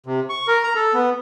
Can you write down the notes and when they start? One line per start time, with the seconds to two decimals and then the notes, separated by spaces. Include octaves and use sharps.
0.06 C3
0.29 C#6
0.48 A#4
0.63 A#5
0.75 A4
0.94 B3